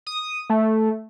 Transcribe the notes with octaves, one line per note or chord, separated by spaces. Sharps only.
D#6
A3